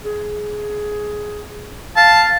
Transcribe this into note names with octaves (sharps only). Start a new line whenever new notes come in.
G#4
F5 A5